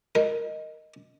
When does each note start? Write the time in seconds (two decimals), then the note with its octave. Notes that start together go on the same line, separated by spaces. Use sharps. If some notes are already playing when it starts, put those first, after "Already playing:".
0.15 A#4 D#5